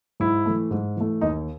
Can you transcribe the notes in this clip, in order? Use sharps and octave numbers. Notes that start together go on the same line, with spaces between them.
G#2 E4
E3 A3
G#2
E3 A3
D#2 D#4